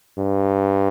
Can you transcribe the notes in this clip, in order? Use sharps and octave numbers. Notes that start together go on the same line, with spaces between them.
G2